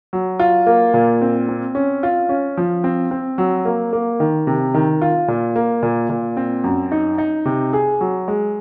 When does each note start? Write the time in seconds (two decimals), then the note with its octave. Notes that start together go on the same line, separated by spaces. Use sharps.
0.13 F#3
0.40 F4
0.67 A#3
0.94 A#2
1.22 C4
1.48 C4
1.75 C#4
2.03 F4
2.29 C#4
2.57 F3
2.84 C4
3.11 C4
3.38 F#3
3.65 A#3
3.93 A#3
4.20 D#3
4.47 C3
4.74 D#3
5.02 F4
5.28 A#2
5.56 A#3
5.83 A#2
6.10 A#2
6.37 C4
6.64 F#2
6.92 D#4
7.18 D#4
7.45 C3
7.73 G#4
8.01 F#3
8.28 G#3